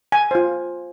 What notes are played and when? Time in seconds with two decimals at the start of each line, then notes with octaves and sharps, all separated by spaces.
0.12 G#5
0.31 F4 C5